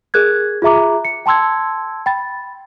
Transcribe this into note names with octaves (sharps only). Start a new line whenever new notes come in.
G#4 A#4 F#6 G#6
F4 G#4 E5 A#5 D6
C#7
G5 A5 C6 E6 G#6
G5 B5 A6